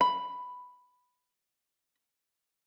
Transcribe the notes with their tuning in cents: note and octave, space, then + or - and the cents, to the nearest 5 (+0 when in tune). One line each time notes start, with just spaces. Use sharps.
B5 +5